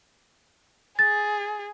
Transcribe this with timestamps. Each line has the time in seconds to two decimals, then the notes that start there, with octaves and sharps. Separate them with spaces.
0.99 G#4 A6